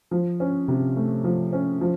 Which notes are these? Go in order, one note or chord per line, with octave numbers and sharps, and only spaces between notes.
F3
C#4
C3
A3
F3
C#4
F3